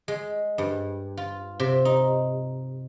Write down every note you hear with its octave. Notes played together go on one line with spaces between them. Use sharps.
G#3
G2
F4
C3
D#4